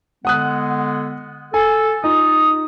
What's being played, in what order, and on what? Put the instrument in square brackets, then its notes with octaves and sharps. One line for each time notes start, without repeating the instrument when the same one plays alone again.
[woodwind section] D3 G#3 B3 [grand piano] F#5 D#6 F#6
[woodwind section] A4 [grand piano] G#5
[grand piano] D#4 [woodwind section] F4 [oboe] D#6